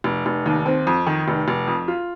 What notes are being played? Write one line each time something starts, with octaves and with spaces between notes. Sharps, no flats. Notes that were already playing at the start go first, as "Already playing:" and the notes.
F1
F1
D#2
C4
F2
D#3
F1
F1
F2
F4